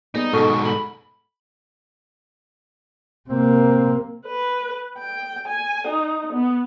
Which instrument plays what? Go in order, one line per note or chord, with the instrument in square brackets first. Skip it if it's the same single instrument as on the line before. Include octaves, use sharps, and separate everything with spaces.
[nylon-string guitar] G3 B3 G#4 [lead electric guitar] D#4
[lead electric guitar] G#2 B2 [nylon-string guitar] D#4 G#4 A4 [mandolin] C#6 F6
[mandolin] B5
[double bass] C3 A#3 [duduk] C4
[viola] B4
G5
G#5
D#4
B3